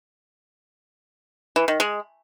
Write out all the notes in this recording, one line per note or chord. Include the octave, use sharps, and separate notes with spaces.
E3
D#3
G#3